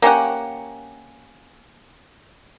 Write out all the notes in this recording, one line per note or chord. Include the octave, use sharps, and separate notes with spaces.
A#3 C#4 G4 F#5